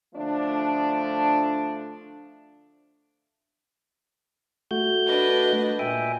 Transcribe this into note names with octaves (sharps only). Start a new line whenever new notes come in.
D3 F3 A3 D4
A3 F#4 G6
D4 B4 D#5
A#2 E5 G5 G#5